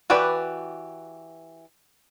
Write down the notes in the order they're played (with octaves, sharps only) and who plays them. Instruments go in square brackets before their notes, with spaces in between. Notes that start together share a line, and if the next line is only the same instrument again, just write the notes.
[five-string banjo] E3 F#4 G4 B4 D5